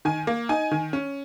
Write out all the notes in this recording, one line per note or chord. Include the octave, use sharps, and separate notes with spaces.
D#3 G#5
A#3
D#4 G#5
D#3
C#4